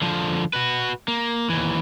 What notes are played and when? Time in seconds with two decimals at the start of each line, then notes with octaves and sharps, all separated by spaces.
0.02 D3 F3
0.53 F#4 B4
1.08 A#3
1.50 D#2 E3